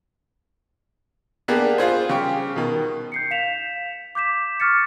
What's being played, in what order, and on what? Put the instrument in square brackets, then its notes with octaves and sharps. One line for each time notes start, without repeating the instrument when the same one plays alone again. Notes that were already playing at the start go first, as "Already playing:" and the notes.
[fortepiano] A#3 B3 D4 G4 G#4
F4 G#4 C5
C#3 G4
B2 D#3
[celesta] G6 C7 C#7
F5 B6 E7 F7
D6 G6 B6 E7
C#6 D6 F6 A6 C#7